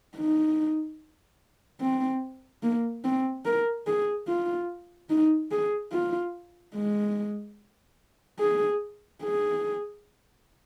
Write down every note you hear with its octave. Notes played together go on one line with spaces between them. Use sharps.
D#4
C4
A#3
C4
A#4
G#4
F4
D#4
G#4
F4
G#3
G#4
G#4